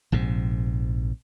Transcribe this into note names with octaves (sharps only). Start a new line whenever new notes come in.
A#1 G#2 C3